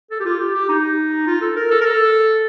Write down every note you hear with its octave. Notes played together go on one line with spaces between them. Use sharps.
A4
G4
F4
G4
G4
D#4
F4
A4
A#4
A4
A#4
A4